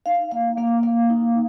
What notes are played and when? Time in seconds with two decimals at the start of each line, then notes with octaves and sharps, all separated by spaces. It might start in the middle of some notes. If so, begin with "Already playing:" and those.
0.06 D#4 F5
0.32 A#3 F5
0.57 A#3 F5
0.83 A#3 F5
1.10 D#4